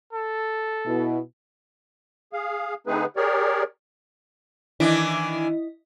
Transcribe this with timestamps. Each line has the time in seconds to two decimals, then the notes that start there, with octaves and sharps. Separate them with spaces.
0.13 A4
0.86 B2 E4
2.33 G#4 F5
2.87 D3 A3 C4 D#4 G#4 B4
3.16 G4 G#4 A#4 C#5 D5
4.80 D#3 E3 D4 E4 D#5